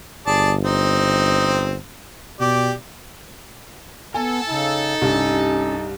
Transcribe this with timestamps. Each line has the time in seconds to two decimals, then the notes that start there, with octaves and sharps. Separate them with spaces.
0.27 G1 G#4 D5 A5
0.64 C4 D#4
2.40 B2 G4 D5
4.14 B3 A4 G#5
4.50 C#3 D#4
5.02 C2 G2 C#4